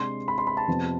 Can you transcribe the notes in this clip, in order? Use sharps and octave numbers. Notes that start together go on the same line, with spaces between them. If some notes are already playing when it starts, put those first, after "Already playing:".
Already playing: C3 G#3 D4 C6
B5
C6
B5
A5
F2 C3 F3 B3